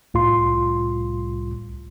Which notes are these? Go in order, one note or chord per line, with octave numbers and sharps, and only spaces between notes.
C2 A2 F4 C6